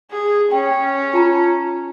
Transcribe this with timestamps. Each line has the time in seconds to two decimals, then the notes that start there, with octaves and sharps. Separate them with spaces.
0.11 G#4
0.52 C#4 G5
1.14 F4 A5 A#5